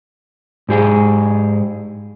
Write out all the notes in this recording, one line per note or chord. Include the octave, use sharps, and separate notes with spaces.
G#2 G4 G#4